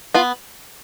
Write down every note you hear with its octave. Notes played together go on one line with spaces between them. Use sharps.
B3 F4